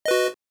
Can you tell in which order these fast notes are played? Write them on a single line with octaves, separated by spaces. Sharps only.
D#5 B4 F#4